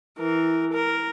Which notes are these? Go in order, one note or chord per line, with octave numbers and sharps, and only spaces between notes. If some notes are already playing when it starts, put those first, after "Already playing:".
E3 A#4
A#4